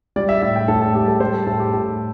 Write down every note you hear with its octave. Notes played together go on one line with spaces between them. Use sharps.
G3 D5
E5
A2 E5
G5
A2 A4
A4
G3 G4
A4
G3 C5
A4
A2 A4
G4
A2 A4